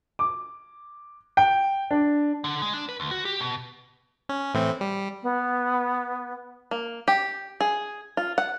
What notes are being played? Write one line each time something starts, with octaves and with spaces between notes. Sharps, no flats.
D6
G5
D4
D3
G#3
D4
B4
D2
F#4
G4
B2
C#4
A2 E3 C4
G3
B3
A#3
G4
G#4
F4
F#5